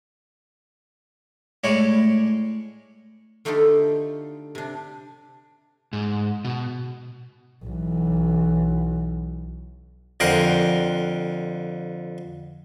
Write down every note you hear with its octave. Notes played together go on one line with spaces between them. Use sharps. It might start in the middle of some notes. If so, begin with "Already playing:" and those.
A2 G#3 C#5 D5
D3 A3 D#4 F4 G4 A4
C3 D4
G#2
B2
B1 E3
F2 D3 A#4 F#5 G5 C6